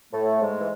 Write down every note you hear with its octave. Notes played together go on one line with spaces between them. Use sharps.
A2 A3
G#2 G#3
E3